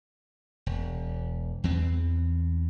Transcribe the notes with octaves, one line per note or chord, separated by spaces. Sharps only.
E1
E2 E3 C4